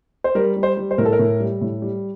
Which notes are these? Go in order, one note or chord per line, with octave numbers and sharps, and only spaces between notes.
C5
G3 A#4
G3
C5
G3
C5
A2 A#4
A4
A#4
A2
G3
A2
G3